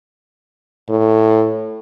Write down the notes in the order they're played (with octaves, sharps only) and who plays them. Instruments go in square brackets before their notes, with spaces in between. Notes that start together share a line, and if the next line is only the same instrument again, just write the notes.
[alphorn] A2